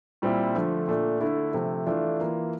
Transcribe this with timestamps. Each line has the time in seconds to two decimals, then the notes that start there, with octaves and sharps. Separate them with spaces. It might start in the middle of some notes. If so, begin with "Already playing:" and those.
0.22 A#2 G3 C4 E4
0.55 D3 F3 A3
0.87 A#2 A3 D4
1.21 D3 A3 E4
1.53 C3 F3 A3
1.86 E3 A3 D4 F4
2.19 E3 A#3 F4